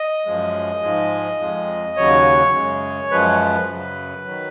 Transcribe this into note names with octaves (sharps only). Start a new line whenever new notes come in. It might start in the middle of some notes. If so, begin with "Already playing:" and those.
Already playing: D#5
F#2 F3 G#3
G#2 F3 G#3
F2 F3 G#3
D#2 C#3 F#3 C#5
F#2 C#3 G#3
F#2 F3 G#3 B4
F#2 C#3 F#3
D#3 F#3